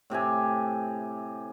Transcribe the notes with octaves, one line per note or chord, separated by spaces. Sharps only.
A2 C3 G4 G#5